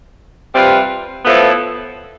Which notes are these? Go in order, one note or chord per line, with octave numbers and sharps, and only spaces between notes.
C3 G3 C4 F4 B4
A2 F3 B3 E4 A4